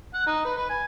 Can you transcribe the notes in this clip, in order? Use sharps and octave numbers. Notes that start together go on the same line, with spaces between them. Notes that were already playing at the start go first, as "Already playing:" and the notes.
F#5
D#4
B4
B4
G#5